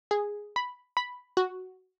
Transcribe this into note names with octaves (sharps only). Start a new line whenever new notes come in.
G#4
B5
B5
F#4